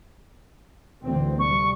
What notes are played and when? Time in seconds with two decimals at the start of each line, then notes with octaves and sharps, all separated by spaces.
1.03 D2 E3 C4
1.39 C3 G3 C#6